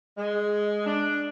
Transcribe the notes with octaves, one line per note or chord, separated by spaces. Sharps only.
G#3
D4